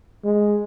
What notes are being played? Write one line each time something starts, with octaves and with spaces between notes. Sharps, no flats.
G#3